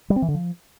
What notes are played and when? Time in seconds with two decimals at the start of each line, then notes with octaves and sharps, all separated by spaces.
0.10 G3
0.16 C4
0.22 E3
0.28 D3
0.34 F3